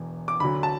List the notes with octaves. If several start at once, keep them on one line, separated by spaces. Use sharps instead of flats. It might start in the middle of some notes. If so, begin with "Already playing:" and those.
Already playing: E1 E2 E3
D6
D2 D3 F#3 B5
A5